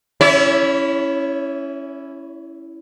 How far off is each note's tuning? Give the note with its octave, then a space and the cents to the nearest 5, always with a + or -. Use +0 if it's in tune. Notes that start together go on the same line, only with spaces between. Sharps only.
C#4 +0 E4 +0 C#5 +45